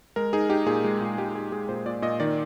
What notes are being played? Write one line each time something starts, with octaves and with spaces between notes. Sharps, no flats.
G#3 A#4
D#4 G#4
D#4 G4
A#2 G#4
G#3
A#2
G#3 G4
D#4 G#4
G#3 G#4
A#2 C5
A#2 D5
A#2 D#5
D#3 D5